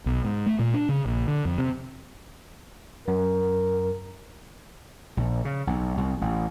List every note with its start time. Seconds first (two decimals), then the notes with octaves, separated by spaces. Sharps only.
0.06 B1
0.25 G#2
0.46 A3
0.59 A#2
0.74 D4
0.89 C#3
1.05 A#1
1.27 D3
1.45 F2
1.58 C3
3.08 F#2 A#4
5.17 A#1
5.45 C#3
5.67 B1
5.97 C2
6.21 A1